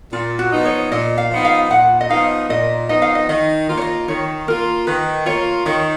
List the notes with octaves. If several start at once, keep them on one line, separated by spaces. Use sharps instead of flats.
A#2 F4
F#4
F3 B3 D#4
C#5
A#2 D#5
F5
F3 B3 D#4
F5
A#2 F#5
D#5
F3 B3 D#4 F5
A#2 D#5
F3 B3 D#4 D#5
F5
D#5
D#3 D#5
A#3 F4
C#5
D#5
D#3 C#5
A#3 F4 A#4
D#3 B4
A#3 F4 C#5
D#3 C#5